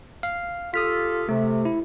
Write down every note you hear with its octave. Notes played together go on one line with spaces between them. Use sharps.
F5
F4 G4 A4 D#6 F6 B6
C3 A3
E4